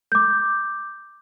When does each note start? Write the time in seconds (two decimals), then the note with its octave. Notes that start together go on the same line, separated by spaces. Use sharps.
0.12 D6 G6